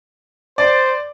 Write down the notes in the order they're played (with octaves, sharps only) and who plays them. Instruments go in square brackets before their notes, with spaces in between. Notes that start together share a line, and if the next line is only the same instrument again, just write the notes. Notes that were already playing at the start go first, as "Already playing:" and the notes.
[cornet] C5 [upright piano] D5